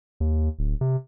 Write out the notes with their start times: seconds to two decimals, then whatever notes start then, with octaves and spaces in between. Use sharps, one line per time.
0.20 D#2
0.59 D1
0.81 C3